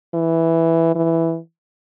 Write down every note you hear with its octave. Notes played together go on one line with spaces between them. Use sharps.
E3
E3